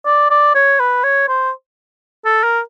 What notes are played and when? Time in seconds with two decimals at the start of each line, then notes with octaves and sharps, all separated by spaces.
0.06 D5
0.30 D5
0.55 C#5
0.79 B4
1.04 C#5
1.28 C5
2.25 A4
2.43 A#4